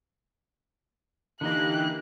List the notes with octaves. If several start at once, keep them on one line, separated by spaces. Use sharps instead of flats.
D3 E3 A#3 D#4 G4 D#5 F#6